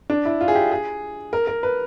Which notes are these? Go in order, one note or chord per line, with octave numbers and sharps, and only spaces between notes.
D4
E4
F4
G#4
G4
G#4
A#4
A#4
B4